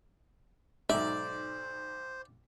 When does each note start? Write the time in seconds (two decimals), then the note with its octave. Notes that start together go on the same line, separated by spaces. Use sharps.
0.89 B1 G#2 C5 D5 E5